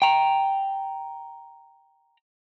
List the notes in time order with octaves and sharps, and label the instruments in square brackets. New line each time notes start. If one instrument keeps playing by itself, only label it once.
[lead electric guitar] G5 A#5